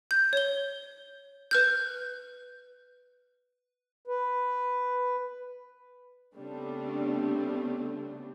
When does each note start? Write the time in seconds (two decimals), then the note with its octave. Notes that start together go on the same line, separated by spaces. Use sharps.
0.11 G6
0.33 C#5 G7
1.51 B4 F6 G6
4.07 B4
6.36 C#3 G3 A3 B3 C4 D4